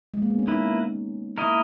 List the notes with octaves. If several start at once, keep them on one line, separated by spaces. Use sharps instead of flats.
G#3
A#3
B3
C#4
A#3 B3 D#4 E4 B4
A#3 E4 A#4 D#5